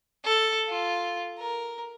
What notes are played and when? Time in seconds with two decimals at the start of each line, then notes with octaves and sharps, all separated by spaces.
0.25 A4
0.68 F4
1.39 A#4